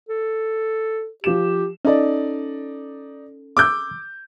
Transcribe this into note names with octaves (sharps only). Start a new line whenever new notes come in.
A4
F3 G4 E7
C#4 D#4 A4 D5
D6 E6 G6